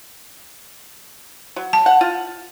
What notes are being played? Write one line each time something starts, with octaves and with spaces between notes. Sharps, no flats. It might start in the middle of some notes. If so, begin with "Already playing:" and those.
F#3
A5
F#5
F4